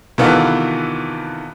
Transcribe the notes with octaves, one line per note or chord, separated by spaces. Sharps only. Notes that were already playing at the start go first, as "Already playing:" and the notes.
C3 D#3 E3 B3 F4 A4